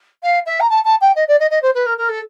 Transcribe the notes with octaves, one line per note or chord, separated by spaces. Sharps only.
F5
E5
A#5
A5
A5
G5
D#5
D5
D#5
D#5
C5
B4
A#4
A#4
A4